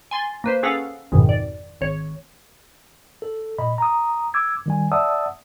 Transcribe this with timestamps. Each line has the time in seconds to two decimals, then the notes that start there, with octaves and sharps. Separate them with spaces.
0.11 G#5 C6 A6
0.44 A#3 B4 C5
0.63 C#4 G#4 A4 B4 F5 F#5
1.12 G#1 F2 G#2 B2 D#3
1.29 D5
1.81 G#1 C#5
3.22 A4
3.58 A#2 D#5 B5
3.78 A#5 D#6
4.34 D6 E6 G#6
4.66 D#3 G3 G#5
4.92 D5 E5 F#5 A5 D#6 E6